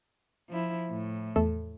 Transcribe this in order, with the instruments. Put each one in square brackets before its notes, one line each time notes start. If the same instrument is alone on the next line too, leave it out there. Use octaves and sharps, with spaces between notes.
[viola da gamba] F3 E4
A2
[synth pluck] E2 A3 A4